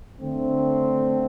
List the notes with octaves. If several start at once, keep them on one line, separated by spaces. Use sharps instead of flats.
D3 A3 C4